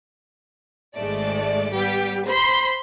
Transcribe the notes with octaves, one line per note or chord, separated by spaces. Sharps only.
G#1 G#2 G#3 A3 D5
G3 B3 G4
C5 B5 C6